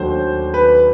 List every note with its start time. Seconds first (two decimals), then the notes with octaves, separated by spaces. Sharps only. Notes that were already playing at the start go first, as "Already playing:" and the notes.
Already playing: D#2 D#3 F#3 A3 D4 C5
0.54 B4